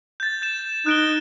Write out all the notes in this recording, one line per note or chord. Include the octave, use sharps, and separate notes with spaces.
G6 A6
G6 E7
D#4 F#6 D7 G7